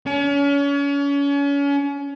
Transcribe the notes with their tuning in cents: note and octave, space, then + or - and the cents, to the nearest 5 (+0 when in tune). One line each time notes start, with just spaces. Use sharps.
C#4 +35